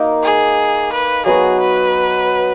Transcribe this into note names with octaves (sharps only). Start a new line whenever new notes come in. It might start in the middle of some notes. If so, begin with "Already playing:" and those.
Already playing: A#3 D#4 A#4
G#4
B4
F#3 B3 F#4 G#4
B4